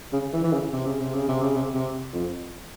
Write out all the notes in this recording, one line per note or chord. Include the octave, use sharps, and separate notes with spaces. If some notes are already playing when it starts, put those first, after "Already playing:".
C#3
E3
E3
C#3
C3
C#3
C3
C#3
C3
C#3
C3
C3
F2